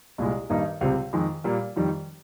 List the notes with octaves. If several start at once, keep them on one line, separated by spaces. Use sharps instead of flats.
C2 A#2 G#3
G2 D#3 A#3 D#4
C#2 C3 G3 C4
F2 D#3 G#3
A#2 G3 A#3
F2 D#3 G3